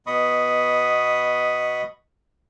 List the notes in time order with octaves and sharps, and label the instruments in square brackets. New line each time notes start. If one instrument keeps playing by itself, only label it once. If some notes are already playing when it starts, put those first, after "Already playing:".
[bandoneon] B2 B3 D#5 B5 C#6 D#6